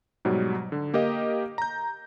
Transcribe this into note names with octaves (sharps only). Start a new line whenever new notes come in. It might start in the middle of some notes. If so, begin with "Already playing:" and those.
G#2 B2 F#3 G3
D3
A#3 G4 A#4 D#5 F5
A#5 G6